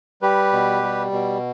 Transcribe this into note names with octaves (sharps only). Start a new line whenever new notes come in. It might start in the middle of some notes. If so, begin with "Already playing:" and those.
G3 G4 B4
B2
G3
B2